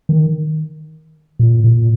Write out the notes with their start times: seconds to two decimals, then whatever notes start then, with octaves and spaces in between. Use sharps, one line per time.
0.09 D#3
1.39 A#2
1.64 A#2